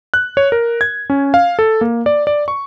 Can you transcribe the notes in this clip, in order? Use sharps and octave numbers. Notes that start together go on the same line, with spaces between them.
F#6
C#5
A#4
G#6
C#4
F5
A4
A#3
D5
D5
C#6